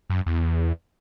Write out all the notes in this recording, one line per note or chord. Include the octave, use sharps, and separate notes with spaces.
F#2
E2